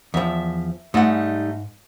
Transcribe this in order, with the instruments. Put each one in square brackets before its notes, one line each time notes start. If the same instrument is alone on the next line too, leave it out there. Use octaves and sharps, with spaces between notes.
[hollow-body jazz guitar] E2 F3 [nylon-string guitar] E5
[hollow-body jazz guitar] G#2 F#5 [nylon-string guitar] G3 A3 D#4